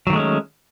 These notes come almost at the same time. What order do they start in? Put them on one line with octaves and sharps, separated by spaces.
F#3 D#3 A3 G#3 C#4